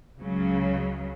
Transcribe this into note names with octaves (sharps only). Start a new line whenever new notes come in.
C#2 C#3 F#3